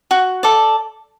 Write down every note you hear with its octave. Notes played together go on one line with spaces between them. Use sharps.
F#4
A4 D5